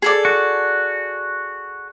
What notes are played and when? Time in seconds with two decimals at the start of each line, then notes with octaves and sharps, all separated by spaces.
0.02 G#4 A4 D5
0.25 F#4